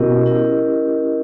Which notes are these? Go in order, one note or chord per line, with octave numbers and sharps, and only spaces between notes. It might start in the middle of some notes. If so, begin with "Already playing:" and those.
Already playing: B2 C#4 E4 G4 A#4 D#5
C#4 E4 G4 A#4 D#5